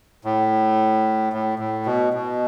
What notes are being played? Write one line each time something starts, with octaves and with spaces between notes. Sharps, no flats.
A2
A2
A2
B2
B2